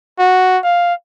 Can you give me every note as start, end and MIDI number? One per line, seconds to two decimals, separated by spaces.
0.19 0.59 66
0.64 0.94 77